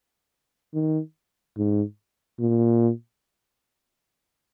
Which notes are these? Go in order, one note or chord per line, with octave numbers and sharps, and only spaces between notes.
D#3
G#2
A#2